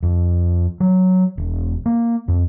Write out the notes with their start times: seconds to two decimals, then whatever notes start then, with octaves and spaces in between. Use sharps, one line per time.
0.03 F2
0.80 F#3
1.38 E1
1.86 A#3
2.28 F2